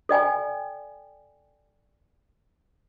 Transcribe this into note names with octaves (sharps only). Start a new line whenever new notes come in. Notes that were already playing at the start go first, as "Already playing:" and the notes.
A4 D5 G5 G#5